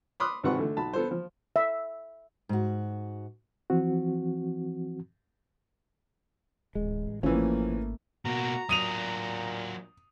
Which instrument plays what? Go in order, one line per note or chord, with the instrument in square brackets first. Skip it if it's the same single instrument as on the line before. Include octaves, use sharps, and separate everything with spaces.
[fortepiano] B5 C6 D6 D#6 F6 F#6
G#1 C3 B4 F#5 C6 C#6
D3 A3
B1 A5 B5
B3 A4 C5
F3
[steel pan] E5
[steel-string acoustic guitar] G#2 F#4
[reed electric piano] E3 F3 C4 F#4
[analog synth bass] D1 [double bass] A1 [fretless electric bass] G#3
[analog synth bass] G#1 [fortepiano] E3 C#4 [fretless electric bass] F3 [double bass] A3 A#3
[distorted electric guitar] B2 A#3 [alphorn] F#4 [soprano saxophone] A#5
[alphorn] A#2 [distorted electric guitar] F#3 D4 [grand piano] D#6 D#7 F7